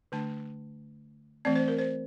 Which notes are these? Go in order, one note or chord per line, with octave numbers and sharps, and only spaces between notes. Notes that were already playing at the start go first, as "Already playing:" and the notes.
D3 A3 D4 A5
E3 A3 C4 D5
C5
A#4
C5